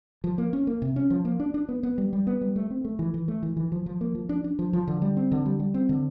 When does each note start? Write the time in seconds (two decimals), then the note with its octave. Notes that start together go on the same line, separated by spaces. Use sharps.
0.24 F3
0.38 A#3
0.53 C#4
0.67 A#3
0.82 C3
0.96 C#4
1.10 F3
1.25 A#3
1.40 D4
1.54 D4
1.69 B3
1.83 B3
1.98 G3
2.13 G3
2.27 B3
2.41 G3
2.56 A3
2.71 C4
2.85 A3
2.99 E3
3.14 E3
3.28 A3
3.43 E3
3.57 E3
3.72 F3
3.86 F3
4.01 A#3
4.15 F3
4.29 D4
4.44 D4
4.59 F3
4.73 F3
4.88 D3
5.02 G3
5.17 C4
5.32 D3
5.46 G3
5.60 G3
5.74 C4
5.89 D3